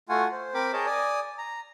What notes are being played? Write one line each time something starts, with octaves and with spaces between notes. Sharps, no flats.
A3 F4 F#4 F#5 G#5
C5
C4 A#4 G5 B5 D6
G#4 A#4 C#5 D#5 A5 G6
D5 G#5 D#6
A#5